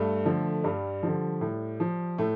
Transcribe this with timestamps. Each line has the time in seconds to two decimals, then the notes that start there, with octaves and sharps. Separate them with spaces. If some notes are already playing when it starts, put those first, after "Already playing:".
Already playing: G2 A3
0.25 D3 F3
0.64 G2 G3
1.03 D3 F3
1.41 A2
1.80 F3
2.18 A2 A3